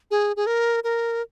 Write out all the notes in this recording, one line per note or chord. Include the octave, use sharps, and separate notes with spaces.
G#4
G#4
A#4
A#4